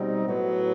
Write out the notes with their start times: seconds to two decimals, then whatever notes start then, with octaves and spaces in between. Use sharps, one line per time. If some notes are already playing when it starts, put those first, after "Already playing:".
Already playing: B2 G3 C4 D#4
0.25 A2 F#3 B3